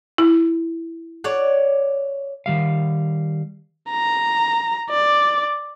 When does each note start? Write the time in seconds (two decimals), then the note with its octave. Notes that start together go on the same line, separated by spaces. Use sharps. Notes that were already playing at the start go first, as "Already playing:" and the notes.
0.18 E4
1.24 C#5 D5 F#5
2.46 D#3 G3 F5
3.90 A#5
4.90 D5